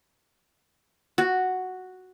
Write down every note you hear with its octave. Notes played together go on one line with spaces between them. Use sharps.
F#4